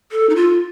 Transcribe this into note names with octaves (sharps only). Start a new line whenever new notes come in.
A4
D#4
F4